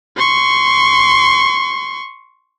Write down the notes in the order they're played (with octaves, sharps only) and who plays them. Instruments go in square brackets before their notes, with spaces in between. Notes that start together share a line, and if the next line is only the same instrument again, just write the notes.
[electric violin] C6 C#6